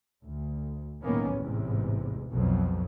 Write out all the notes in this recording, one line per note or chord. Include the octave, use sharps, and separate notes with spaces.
D2
B1 A2 D#3 A#3 B3 C#4
A1 E2 G#2 C3
B1 F2 B2 F#3